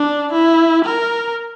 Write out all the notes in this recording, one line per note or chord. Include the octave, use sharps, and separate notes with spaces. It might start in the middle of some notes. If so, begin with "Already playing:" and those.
Already playing: D4
E4
A#4